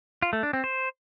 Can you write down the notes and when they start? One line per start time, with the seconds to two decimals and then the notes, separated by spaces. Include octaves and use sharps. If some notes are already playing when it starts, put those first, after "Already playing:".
0.22 F4
0.33 A3
0.43 D4
0.53 C4
0.64 C5